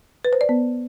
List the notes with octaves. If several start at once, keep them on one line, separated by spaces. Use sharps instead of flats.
B4
C5
D5
B3